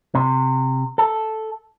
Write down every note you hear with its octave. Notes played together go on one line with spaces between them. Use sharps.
C3
A4